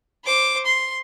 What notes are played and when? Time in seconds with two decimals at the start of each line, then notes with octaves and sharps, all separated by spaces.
0.25 C5 D6
0.66 C6